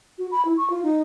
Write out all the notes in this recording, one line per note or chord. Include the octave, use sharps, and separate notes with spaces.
F#4
B5
E4
C#6
F4
D#4